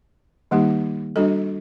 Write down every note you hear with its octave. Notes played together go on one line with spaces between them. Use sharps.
D#3 G3 A#3 D#4 G4
G3 D4 F#4 A4 D#5